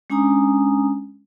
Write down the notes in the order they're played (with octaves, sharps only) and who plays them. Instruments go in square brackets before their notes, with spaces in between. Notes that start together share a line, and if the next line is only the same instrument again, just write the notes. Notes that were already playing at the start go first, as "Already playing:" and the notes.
[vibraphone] G#3 C#4 D4 G#5 A#5 D#6